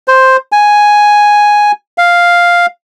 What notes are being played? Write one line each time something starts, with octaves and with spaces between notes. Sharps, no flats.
C5
G#5
F5